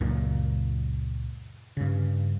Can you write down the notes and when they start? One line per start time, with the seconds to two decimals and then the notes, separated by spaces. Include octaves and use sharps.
0.01 C#2 F#2 A#2
1.77 G2 C#3